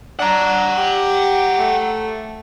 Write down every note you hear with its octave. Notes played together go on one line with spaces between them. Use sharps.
D4 F#5 A#5
G4
A3